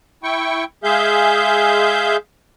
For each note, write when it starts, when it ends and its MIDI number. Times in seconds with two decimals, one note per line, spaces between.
0.23 0.64 64
0.23 0.64 79
0.23 0.64 85
0.84 2.17 56
0.84 2.17 68
0.84 2.17 76
0.84 2.17 77
0.84 2.17 91